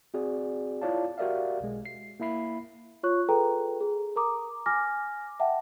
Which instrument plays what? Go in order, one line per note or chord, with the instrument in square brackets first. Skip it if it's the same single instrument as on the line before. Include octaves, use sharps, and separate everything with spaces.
[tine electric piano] C4 F#4 G#4 D5
E4 F4 C#5 D5 F5 A5
F#4 G4 A#4 D5 E5 F5
B1 B2 G#3
C7
A#3 E4 E5 B5 C7
[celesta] F4 C#5 C#6 F#6
F4 G#4 A4 B4 G5 A#5
G#4
A#4 A#5 D6 D#6
G#5 D6 F6 A#6
E5 F#5 G5 A5